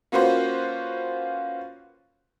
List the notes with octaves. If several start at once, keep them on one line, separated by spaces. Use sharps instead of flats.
A#3 C#4 F4 F#4 B4 C5